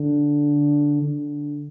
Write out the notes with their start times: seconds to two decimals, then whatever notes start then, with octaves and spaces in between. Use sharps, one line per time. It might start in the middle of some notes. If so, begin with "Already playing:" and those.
Already playing: D3
1.02 D3